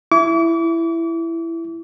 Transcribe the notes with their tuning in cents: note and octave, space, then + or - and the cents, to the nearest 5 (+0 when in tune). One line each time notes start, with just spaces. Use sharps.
E4 +10 D6 -40